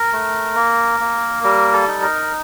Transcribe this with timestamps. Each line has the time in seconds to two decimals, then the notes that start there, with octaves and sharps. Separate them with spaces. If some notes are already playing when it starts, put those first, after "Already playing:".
Already playing: A#4
0.13 A3
0.55 A#3
1.00 A#3
1.43 G3 A#4
1.73 A4
1.88 D#4
2.02 A#4